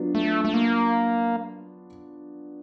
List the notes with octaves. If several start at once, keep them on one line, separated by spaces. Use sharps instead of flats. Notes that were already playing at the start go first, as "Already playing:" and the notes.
Already playing: F#3 B3 D4 F4
A3
A3
A#3